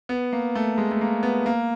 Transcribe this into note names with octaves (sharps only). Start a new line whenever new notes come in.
B3
A#3
A3
G#3
A3
A#3
B3
A#3